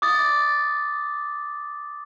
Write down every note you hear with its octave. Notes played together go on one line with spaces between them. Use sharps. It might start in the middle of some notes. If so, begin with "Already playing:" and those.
D6 D#6 A6